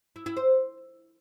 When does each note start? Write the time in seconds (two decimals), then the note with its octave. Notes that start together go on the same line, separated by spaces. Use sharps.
0.16 E4
0.26 E4
0.37 C5